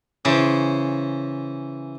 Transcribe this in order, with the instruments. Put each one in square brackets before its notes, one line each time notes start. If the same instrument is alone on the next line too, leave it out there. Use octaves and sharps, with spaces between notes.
[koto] C#3 [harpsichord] E3 C5